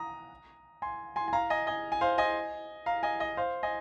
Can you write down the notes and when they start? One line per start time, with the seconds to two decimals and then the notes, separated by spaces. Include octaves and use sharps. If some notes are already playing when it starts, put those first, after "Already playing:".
Already playing: A#5 D#6
0.82 G#5 C6
1.16 G#5 C6
1.28 G#5
1.33 F5 A#5
1.50 D#5 G#5
1.67 D#5 G#5
1.92 G#5
2.01 C5 F5
2.18 D#5 G#5
2.86 F5 A#5
3.03 D#5 G#5
3.20 D#5
3.37 C5 F5
3.63 D#5 G#5